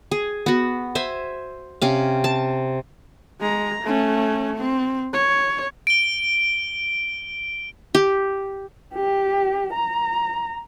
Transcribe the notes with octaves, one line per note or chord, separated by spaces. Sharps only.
G#4
B3 F#4
C5 E5 G#5
C3 C#4 F5
A5
G#3 A#5
A3 C#4
C4
C#5
D7 G7
G4
G4
A#5